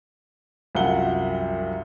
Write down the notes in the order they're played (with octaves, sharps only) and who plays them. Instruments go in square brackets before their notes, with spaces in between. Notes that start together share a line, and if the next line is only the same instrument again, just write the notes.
[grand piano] C2 F#2 F3 F5 F#5 G7